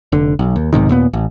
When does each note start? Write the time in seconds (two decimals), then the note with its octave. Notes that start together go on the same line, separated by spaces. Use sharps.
0.12 F1 D3
0.39 B1
0.56 D#2
0.73 B1 G#2 C3 D#3
0.89 D#2 A#2 B3
1.13 A1